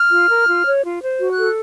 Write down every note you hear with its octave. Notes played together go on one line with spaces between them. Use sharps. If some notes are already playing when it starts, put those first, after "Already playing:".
Already playing: F6
F4
A#4
F4
C#5
F4
C5
F#4
F#6
A4